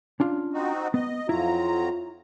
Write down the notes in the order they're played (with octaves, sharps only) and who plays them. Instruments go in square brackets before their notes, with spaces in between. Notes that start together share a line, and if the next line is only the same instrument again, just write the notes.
[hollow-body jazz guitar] C#4 D4 F4
[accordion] C4 D#4 F#4
[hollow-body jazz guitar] B3 [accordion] D#5
[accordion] F2 F#3 A#5 [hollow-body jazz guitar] E4 [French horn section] F4